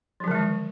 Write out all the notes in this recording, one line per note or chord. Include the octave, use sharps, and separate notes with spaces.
D3 D#3 F3 F#3 G#3